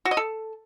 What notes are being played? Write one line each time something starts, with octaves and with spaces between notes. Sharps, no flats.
F#4
D#5
A4